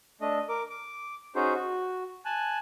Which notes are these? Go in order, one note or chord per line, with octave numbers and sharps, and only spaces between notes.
A3 D4 D#5
A#4 D6
D6
C#4 D#4 F#4 G#4 C5
F#4
G#5 A5 F#6